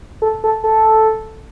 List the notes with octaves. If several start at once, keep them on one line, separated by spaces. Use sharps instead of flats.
A4
A4
A4